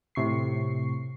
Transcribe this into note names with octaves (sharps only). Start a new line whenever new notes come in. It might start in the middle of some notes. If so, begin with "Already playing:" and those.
A2 C3 C#6 C7